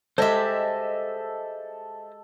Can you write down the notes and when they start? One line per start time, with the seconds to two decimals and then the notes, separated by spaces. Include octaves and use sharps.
0.18 G#3 G4 A4 C5 D#5 E5